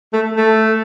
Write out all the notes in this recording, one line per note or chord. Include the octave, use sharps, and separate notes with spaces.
A3
A3